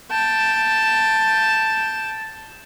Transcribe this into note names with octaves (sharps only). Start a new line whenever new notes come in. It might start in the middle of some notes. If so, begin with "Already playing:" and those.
G5 A5